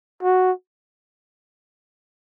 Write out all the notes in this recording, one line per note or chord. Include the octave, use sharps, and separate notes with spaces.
F#4